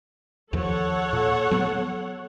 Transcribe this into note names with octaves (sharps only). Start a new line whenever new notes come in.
D#2 F3 A4 C#5 F#5
A#2
F#3 B3